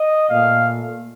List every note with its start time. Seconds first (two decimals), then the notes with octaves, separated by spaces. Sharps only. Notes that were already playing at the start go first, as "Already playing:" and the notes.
Already playing: D#5
0.30 A#2 A3 F5